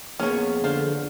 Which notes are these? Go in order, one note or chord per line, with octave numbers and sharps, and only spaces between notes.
F2 A#3 B3 C#4 G#4 C#5
D3 F4 C5